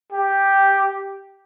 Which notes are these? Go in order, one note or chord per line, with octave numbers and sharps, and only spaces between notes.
G4